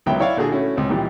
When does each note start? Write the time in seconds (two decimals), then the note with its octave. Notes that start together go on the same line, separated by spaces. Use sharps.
0.06 C#2 D#3 F#3 B3 E5 G5
0.20 E4 C#5 D5 F5
0.37 A#2 D3 F#4 G#4
0.51 A3 C#4 E4 F#4
0.76 C#2 C4
0.89 A#2 D#3 E3 G3 G4